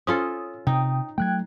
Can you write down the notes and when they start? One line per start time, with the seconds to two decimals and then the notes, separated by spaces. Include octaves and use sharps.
0.07 C#4 F4 A4 D#6
0.67 C3 D#4 G5 D#6
1.18 F#3 A3 G5 F#6 G#6